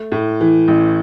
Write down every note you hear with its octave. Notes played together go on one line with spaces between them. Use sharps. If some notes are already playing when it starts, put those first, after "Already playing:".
Already playing: A3
A2
E3
A1